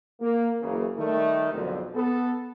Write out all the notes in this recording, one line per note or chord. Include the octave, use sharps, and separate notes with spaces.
A#3
F#1 C#3 E3 A#3
D#3 G3 A3
B1 F2 G#2 D3 F3 F#3
B3 A4